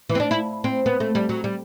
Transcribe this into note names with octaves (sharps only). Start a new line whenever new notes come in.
E3
C4
D4
E4
C4
B3
A3
G3
F#3
G3